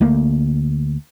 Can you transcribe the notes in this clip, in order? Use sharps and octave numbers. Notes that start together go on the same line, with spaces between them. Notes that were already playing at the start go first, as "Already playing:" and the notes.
D2 A3 A#3